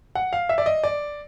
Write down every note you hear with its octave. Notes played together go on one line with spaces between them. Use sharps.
F#5
F5
E5
D5
D#5
D5